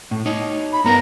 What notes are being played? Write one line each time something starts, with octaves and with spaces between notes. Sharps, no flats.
A2
D#4 C#5
B5
G2 B3 A#4 A#5